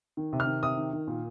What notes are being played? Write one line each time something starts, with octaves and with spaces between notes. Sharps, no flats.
D#3
C3
F6
D#3
C3 D#6
D#3
D#3
A#2